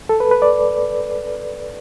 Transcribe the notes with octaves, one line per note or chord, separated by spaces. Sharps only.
A4
B4
B4
D5